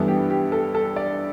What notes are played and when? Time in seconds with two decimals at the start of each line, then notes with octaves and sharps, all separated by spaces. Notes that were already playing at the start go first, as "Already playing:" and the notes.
Already playing: G2 E3 B3 E4 A4
0.08 G4
0.30 G4
0.52 A4
0.75 A4
0.96 D5